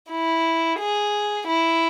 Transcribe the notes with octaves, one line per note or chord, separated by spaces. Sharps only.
E4
G#4
E4